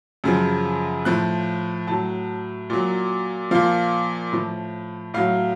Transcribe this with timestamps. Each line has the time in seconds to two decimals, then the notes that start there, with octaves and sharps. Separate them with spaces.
0.24 F#2 C#3 F3
1.05 A2 F3 F#6
1.87 A2 F#3 A5
2.70 A#2 F#3
3.51 A#2 F3 F5
4.32 A2 F3
5.14 A2 F#3 F5